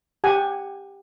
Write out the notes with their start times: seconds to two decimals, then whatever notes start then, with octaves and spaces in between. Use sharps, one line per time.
0.24 G4 F#5 G#5